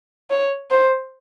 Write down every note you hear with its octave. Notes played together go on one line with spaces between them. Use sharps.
C#5
C5